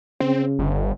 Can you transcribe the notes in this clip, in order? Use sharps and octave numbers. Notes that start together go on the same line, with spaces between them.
C#3 C4
G1